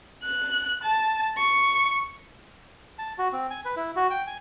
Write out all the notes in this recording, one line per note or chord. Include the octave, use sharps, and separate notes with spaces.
F#6
A5
C#6
A5
F#4
C4
G#5
B4
E4
F#4
G5
G#5